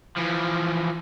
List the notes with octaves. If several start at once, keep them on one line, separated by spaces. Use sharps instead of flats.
E3 F3